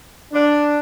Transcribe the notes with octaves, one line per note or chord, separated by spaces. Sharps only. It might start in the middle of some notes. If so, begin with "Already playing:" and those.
D4